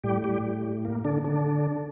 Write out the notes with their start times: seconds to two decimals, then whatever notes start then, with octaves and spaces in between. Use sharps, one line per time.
0.04 A2 G3 G4
0.24 G3 G4
0.85 A#3
1.05 D3 D4
1.24 D3 D4